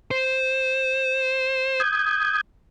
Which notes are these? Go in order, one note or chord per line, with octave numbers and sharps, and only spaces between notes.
C5
D#6 G6 G#6